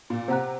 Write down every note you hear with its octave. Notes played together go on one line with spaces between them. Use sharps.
A#2
C3 C5 F#5 A#5 F#6